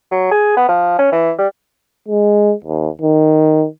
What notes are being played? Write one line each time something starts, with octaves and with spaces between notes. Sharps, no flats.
F#3
G#4
B3
F3
C#4
E3
G3
G#3
D#2
D#3